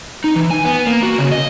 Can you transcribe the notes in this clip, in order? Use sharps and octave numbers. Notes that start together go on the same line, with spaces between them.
D#4
E3
G#5
B3
A#3
F#4
C#3
D#5